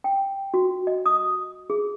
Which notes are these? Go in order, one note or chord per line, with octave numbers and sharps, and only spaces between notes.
G5
F#4
D#5
D#6
G#4